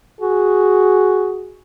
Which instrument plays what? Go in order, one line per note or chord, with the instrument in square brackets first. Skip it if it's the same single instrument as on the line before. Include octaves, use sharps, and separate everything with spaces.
[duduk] F#4 [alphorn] G#4